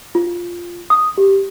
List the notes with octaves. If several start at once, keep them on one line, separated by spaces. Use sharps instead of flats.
F4
D#6
G4